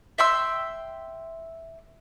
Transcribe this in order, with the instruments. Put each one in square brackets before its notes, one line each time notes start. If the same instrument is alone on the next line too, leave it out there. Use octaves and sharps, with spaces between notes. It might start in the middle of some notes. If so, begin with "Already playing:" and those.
[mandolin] E5 G5 C6 E6